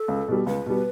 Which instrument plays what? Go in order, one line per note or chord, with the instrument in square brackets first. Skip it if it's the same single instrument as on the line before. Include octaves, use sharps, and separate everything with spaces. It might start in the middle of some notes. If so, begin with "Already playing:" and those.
Already playing: [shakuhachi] A4
[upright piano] C#2
B2 G3
[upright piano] C#2 [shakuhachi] B4
[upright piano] B2 G3